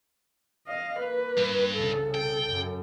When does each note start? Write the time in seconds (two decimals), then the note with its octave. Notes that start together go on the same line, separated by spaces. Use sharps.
0.68 D#5 F5
0.99 A#3 B4
1.38 G2
1.75 C2 C#3 A4
2.15 G5
2.51 F#2